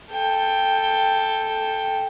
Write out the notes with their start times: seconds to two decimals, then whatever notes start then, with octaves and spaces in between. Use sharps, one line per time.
0.12 A4 G5